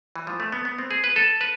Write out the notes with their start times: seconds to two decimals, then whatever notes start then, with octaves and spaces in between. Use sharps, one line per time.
0.16 E3
0.27 F3
0.40 A3
0.52 B3
0.65 B3
0.78 C4
0.91 G#4
1.04 B4
1.16 A4
1.41 B4